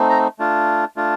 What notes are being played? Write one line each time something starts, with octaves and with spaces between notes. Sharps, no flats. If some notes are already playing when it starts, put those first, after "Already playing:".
Already playing: A3 C4 D#4
A#5
A3 D4 F4
A3 D4 F4